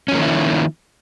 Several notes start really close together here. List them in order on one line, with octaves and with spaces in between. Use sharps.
C#4 F3 A#3 D#3 E4